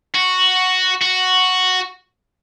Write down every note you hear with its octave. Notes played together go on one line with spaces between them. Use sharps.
F#4
F#4